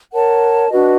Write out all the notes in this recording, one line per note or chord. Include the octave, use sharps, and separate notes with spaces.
A#4 C#5 F#5 A5
D4 F#4 B4 D#5